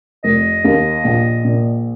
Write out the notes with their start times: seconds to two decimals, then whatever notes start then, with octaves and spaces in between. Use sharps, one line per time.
0.24 F1 D#5
0.65 D#2
1.04 A#1
1.44 A#2